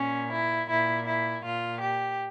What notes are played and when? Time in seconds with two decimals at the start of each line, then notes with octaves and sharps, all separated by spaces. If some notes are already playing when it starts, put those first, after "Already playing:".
Already playing: A#2 C#4
0.31 E4
0.68 A#2 E4
1.06 E4
1.44 A#2 F4
1.81 G4